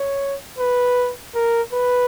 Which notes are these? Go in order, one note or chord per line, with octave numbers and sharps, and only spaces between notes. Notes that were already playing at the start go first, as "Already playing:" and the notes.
Already playing: C#5
B4
A#4
B4